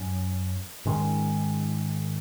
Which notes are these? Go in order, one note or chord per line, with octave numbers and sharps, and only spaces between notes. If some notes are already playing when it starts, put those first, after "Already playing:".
Already playing: F#2 F#3 C#4
G#2 D#3 G#3 C#4